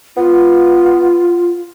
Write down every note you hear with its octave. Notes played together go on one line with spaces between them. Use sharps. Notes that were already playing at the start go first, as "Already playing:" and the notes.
B3 F4